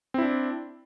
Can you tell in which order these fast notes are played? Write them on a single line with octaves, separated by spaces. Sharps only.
C4 E4 D4